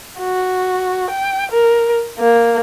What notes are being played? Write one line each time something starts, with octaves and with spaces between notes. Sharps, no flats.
F#4
G5
A#4
A#3